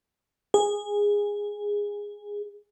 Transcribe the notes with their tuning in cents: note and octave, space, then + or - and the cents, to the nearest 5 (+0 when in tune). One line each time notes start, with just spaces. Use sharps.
G#4 -15